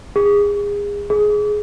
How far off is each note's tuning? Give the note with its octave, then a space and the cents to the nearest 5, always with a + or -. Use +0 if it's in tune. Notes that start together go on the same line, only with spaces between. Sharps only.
G#4 -30
G#4 +10